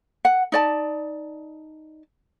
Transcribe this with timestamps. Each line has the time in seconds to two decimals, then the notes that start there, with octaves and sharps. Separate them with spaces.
0.25 F#5
0.52 D#4 D5 A5